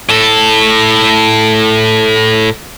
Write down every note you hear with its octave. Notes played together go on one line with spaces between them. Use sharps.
A2 A4